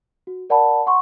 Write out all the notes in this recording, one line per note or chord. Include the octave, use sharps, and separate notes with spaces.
F#4
A#4 D5 F#5 A5 B5
F#5 C6 C#6